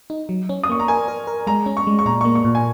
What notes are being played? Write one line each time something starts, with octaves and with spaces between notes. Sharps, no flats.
D#4
F#3
C#4
D#6
A#3 C#6
A#5
A#4 G#5
A#4
A#4
G#3 A#5
C#4
C#6
G#3
C#6
A#2 A#5
A#3 C#6
C#6
A#2
G#5